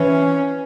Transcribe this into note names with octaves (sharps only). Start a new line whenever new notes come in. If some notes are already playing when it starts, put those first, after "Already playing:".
Already playing: E3 C#4